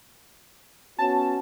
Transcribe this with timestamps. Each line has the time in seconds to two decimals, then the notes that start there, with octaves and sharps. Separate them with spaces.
0.99 B3 C#4 F#4 A5